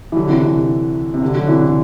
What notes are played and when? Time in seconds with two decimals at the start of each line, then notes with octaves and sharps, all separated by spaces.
0.12 E3
0.16 D3 F#3
0.29 C3 E3
0.43 C3 E3
1.14 C3
1.22 D3
1.35 D3 F#3
1.48 C3 E3
1.61 D3